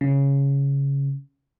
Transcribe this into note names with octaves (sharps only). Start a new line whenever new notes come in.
C#3